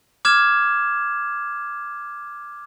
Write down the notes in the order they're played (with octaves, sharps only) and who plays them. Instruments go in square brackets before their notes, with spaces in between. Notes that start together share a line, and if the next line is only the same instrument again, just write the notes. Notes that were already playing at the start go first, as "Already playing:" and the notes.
[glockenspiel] D6 F6 G#6 E7